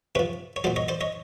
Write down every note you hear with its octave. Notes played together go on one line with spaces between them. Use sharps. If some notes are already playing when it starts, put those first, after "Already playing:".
C3 F3 B4 C#5
C#5
A#2 F#3 C5 D5
C#5 D#5
C5 D5
C#5 D#5